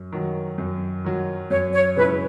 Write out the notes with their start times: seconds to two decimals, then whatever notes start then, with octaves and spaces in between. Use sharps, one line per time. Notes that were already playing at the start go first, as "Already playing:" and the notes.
Already playing: F#2
0.12 D#3 F#3
0.58 F#2
1.04 D#3 F#3
1.50 F#2 C#5
1.73 C#5
1.96 C#3 G#3 C#4 E4 B4